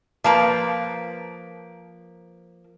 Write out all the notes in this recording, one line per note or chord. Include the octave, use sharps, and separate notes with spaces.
F3 A#3 B4